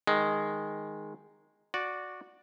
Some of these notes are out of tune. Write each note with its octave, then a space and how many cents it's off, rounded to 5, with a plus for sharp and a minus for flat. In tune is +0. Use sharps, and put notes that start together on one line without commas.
D#3 +0 G#3 +0
F#4 -15 D5 +0